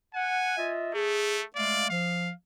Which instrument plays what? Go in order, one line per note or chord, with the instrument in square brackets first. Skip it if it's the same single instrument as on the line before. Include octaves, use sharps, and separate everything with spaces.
[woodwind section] F#5 [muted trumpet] G#5
[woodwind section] F4 D#5 E5
[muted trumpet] A3 [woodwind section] G#4
[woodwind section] G#3 A3 F5 [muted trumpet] D5
[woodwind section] F3 [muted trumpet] F5